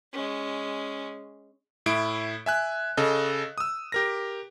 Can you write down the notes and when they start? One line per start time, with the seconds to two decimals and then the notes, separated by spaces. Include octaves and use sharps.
0.13 G#3 C#4
1.86 A2 E4 D7
2.46 E5 G#5 F#6
2.97 C#3 A4 D#5
3.58 D#6 E6
3.92 G4 A#4 A#6